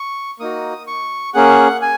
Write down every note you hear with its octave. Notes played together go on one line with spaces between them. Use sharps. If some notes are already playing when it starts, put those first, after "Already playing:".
Already playing: C#6
A#3 D#4 F#4 D#6
C#6
A#3 C#4 G#4 F#5
G#5